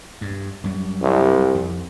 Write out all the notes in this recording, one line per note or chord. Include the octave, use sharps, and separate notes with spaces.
G2
F#2 G3
C2
F2